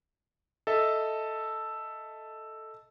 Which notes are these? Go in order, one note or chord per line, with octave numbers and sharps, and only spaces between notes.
A4 D#5 E5 A5